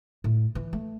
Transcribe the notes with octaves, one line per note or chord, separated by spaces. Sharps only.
A2
E3
A3